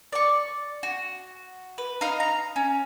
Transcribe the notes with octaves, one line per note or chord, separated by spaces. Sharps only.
D5 C#6
F#4
B4
D#4 F5
A#5
C#4